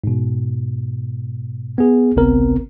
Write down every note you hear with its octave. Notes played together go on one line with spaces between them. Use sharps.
G#2 B2
B3 G#4
G#1 C#2 C3 B3 C4 A#4